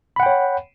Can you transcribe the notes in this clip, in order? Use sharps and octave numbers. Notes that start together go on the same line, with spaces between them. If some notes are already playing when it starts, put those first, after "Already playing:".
C#5 F#5 G5 B5